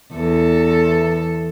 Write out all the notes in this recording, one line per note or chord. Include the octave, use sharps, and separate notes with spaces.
E2 A4